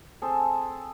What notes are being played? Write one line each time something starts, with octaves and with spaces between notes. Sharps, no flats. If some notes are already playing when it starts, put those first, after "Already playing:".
C4 G#4 A4